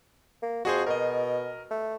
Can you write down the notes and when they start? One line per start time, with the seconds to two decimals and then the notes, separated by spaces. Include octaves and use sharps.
0.42 A#3
0.65 F2 F#4 G#4 C5
0.87 B2 A#4 D#5
1.71 A3